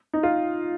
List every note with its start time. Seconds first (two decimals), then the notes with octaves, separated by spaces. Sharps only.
0.13 D#4
0.23 F4